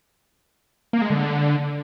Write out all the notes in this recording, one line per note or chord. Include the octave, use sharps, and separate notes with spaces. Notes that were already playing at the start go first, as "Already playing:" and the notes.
A#3
G#3
D3